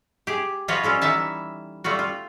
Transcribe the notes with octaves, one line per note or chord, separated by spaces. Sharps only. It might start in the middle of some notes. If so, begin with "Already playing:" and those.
G4 G#4
F3 F4 F#4 B4 C#5 D#5
G3 C#4 F4 A4
E3 B3 D#4 E5 A5
G3 A3 F4 F#4
F4